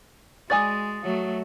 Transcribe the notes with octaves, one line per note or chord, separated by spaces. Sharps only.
G#3 F#4 D5 G#5 D#6 A6
F#3 A3